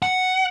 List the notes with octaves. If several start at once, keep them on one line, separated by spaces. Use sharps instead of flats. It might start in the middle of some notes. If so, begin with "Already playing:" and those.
F#5